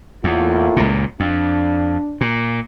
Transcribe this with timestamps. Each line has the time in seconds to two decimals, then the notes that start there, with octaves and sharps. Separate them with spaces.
0.24 E2 A2 A#3 F4
0.76 C#2 A#2
1.20 F2 D4
2.21 A#2